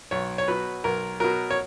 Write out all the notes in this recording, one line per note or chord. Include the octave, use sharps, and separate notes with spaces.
B1 C#5
C#5
B2 F#3 B4
B1 A#4
B2 F#3 A#4
C#5